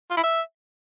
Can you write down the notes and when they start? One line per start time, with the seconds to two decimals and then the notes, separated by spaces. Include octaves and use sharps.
0.11 F4
0.17 E4
0.23 E5